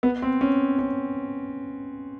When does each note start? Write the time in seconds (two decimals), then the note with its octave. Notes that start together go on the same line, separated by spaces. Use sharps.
0.03 B3
0.22 C4
0.41 C#4
0.79 C#4